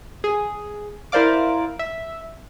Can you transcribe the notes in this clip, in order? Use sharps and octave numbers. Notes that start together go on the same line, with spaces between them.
G#4
E4 A#4 C5 D5 F5 D6
E5